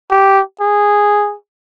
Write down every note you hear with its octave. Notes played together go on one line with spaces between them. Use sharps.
G4
G#4